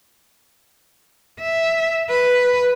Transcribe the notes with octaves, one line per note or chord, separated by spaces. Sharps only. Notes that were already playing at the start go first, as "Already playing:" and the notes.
E5
B4